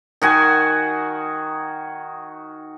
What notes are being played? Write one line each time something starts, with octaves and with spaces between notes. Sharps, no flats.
D#3 F#4 G#5